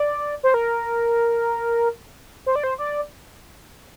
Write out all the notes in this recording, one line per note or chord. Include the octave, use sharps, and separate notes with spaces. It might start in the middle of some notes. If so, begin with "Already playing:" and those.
Already playing: D5
C5
A#4
C5
D5
C5
D5